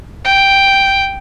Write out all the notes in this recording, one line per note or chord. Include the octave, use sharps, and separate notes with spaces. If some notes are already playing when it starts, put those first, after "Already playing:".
G5